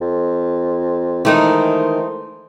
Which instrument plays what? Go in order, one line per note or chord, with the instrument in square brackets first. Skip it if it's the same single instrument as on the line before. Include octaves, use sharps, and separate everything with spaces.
[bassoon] F2
[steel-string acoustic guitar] D#3 G#3 A#4 [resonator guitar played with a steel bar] E3 A3 D#4 [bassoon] C5